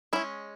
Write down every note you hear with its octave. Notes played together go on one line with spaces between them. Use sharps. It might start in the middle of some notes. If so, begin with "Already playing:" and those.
G#3 C#4 E4